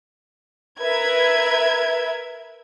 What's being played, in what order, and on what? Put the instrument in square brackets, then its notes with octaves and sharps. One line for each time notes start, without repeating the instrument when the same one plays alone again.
[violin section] A#4 B4 E5 G#6